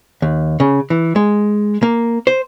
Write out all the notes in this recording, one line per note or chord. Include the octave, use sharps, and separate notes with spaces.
D#2
C#3
E3
G#3
A#3
C5